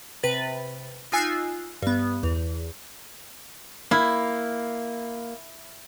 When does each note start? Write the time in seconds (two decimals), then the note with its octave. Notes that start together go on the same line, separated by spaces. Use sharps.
0.23 C3 B4 A6
1.12 D#4 F4 G#5 E6 F#6 C7
1.82 G2 B3
2.23 E2
3.91 A#3 E4